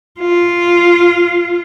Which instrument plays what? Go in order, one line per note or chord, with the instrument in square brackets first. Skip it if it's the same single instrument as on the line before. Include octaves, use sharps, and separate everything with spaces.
[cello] F4